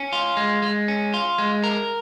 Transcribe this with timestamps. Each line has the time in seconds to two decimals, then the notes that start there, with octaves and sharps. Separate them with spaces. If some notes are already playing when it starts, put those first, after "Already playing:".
Already playing: C#4
0.13 F4
0.37 G#3
0.62 G#3
0.88 C#4
1.14 F4
1.38 G#3
1.64 A#4